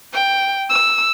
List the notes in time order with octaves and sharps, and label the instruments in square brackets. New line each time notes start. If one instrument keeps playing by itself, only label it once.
[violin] G5
E6